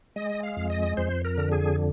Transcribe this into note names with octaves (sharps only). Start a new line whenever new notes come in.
G#3 D#5
F5
F2
D#5
F2 C5
A#4
D3
G#4